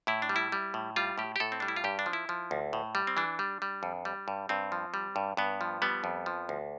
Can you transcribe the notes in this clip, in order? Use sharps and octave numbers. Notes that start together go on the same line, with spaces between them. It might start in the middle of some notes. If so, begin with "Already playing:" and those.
A2 E4
D4
G3
E4
G3
A2
G3 F4
A2 G4
G4
A2 A4
C4
G3 D4
E4
F4
G2 G4
D4
F3
E4
F3
D2
A2
G3
C4
E3 D4
G3
G3
F2
G3
G2
G2 C4
F3
G3
G2
G2 B3
F3
G3 B3
F2
F3
D2